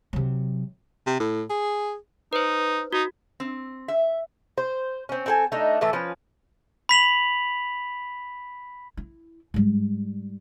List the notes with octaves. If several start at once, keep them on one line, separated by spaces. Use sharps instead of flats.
C3 F#3
C3
A2
G#4
D#4 B4 C5
D#4 F#4
C4
E5
C5
C4 C#4
C4 A4 G#5
A3 D4 D#4
A2 E3 A3 A4
F3 C#4 B4
B5 B6 F7 F#7
E4
G#2 G3